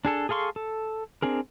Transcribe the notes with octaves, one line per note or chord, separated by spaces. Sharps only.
D4 G#4 A4
G#4 A4 F5 C6 C#6
A4
C4 D4 G#4 A#4